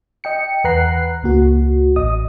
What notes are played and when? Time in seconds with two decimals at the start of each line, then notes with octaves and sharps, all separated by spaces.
0.24 D#5 G5 C#7
0.64 E2 B4 F#5 A#5 F#6 C7
1.23 C#2 A#3 F#4
1.96 A1 D#5 D#6